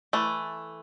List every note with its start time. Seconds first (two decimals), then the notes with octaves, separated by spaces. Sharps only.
0.13 E3 A3